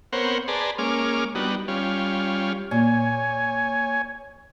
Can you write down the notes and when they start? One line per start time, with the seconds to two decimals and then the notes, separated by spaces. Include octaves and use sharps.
0.13 B3 C4 A#4 C5 C#5 F#5
0.48 G#4 B4 D5 A5 A#5 C6
0.78 G#3 A#3 C#4 D6 F6
1.35 G3 B3 D4 D#4 F#4
1.68 G3 C#4 F4
2.71 A#2 C#5 G#5